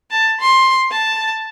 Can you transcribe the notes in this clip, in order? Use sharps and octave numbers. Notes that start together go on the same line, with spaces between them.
A5
C6
A5